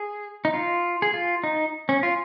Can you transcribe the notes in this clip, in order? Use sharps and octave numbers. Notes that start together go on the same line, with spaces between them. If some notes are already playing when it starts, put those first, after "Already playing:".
Already playing: G#4
D#4
F4
G#4
F4
D#4
C#4
F4